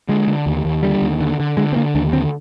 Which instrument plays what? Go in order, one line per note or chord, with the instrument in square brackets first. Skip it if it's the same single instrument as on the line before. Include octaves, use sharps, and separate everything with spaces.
[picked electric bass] D3 G#3
D3
D#2
D#2
D3 G3
D#2
D3
D3
D3 G#3
C4
D3 A#3
D#2 D4
D3 C4